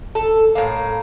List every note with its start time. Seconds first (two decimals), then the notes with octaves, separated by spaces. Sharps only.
0.15 A4
0.55 A2 A#3